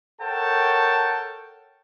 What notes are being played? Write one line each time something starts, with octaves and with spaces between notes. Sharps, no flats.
A4 A#4 C#5 F#5 G5 A5